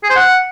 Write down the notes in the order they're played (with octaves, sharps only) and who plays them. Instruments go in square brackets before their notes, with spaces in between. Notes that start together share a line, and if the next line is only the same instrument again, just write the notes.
[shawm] G#4
C5
F#5